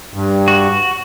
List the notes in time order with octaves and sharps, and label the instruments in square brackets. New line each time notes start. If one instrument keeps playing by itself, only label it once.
[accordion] G2
[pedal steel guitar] F#4